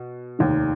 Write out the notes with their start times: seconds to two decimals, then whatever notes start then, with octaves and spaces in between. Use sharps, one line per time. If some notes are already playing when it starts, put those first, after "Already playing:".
Already playing: B2
0.39 F1 D#2 D#3